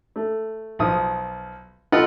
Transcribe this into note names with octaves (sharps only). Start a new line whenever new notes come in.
A3
B1 F3 D#6
F4 A4 B4 D#5 F#5